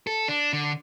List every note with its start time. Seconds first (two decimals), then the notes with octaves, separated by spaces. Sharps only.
0.07 A4
0.28 D4
0.53 D3